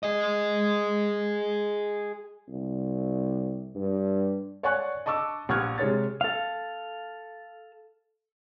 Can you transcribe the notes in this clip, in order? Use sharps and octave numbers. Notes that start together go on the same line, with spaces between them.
G#4 D#5
C2
G2
C#5 D5 F#5 G#5 C#6 F#6
D#5 A5 C#6 D6 E6
A#1 G4 F#5 C#6 F6 G#6
C3 G#3 C#5 A6
A4 F5